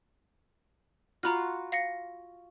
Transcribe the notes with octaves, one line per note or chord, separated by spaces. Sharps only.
F4 F#4 A#5 B5 F6
F5 A#6 C#7